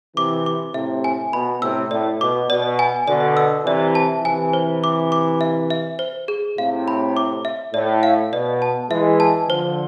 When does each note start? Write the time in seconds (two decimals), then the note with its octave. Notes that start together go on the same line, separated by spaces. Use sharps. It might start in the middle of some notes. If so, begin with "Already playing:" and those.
0.16 C3 E3 D6
0.46 D6
0.74 A2 C3 E5
1.04 G#5
1.33 B2 B5
1.62 A2 C3 E6
1.91 A2 D5
2.21 B2 D6
2.50 B2 D5
2.79 G#5
3.08 B2 D3 D5
3.37 E6
3.66 C3 E3 D5
3.95 A5
4.24 C3 E3 G#5
4.53 C5
4.84 D6
5.12 D6
5.41 E5
5.70 E5
5.99 C5
6.28 G#4
6.58 A2 C3 F5
6.88 B5
7.17 D6
7.45 E5
7.74 A2 D5
8.03 F5
8.33 B2 D5
8.62 A5
8.91 E3 G#3 E5
9.20 A5
9.49 D3 F3 C5